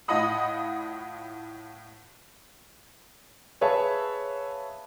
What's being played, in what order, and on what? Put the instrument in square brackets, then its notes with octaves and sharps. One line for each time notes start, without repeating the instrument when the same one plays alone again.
[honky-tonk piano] A2 F4 D#5 F#5 B5 D#6
[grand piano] G#4 B4 C#5 E5 F5 A5